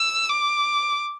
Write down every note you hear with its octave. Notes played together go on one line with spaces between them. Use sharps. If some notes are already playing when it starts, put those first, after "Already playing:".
Already playing: E6
D6